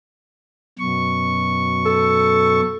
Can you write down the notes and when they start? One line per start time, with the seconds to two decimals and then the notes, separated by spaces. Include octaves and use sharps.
0.79 F#2 B2 C#6
1.85 A4